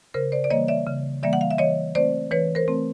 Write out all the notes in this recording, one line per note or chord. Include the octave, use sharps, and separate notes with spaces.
C#3 A#4 C5
C5 D5
D5
E3 G3 A#3 C#5 D#5
D5 E5
C#3
E3 G3 A#3 D5 E5
F#5
F5
E5
E3 C#5 D#5
A3 C4 C5 D5
E3 B4 C#5
A#4 C5
A3 C4